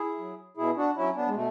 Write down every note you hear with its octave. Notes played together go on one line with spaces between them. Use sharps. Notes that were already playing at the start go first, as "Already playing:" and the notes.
Already playing: E4 G#4
F#3
B2 E4 G#4
D4 F#4
F#3 C#4 E4
B3 D4
G#3
B2 A3